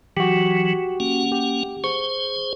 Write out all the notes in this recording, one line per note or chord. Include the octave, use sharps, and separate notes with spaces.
E3 F#3 F#4 G4
A#3 C#4 F#5
G4
G#4 C5 C#6